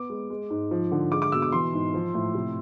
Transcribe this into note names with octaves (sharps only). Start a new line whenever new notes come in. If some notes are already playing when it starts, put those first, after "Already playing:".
Already playing: B3 D6
G#3
G#3
G#2
F3
D3
G#3 D6
D6
B2 E6
D6
E3 C6
G#2
F3
A2
C3